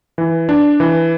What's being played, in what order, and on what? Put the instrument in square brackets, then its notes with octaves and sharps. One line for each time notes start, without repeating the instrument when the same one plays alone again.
[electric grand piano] E3
D4
E3